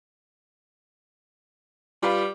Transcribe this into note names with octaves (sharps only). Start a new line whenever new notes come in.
G3 F4 B4 F5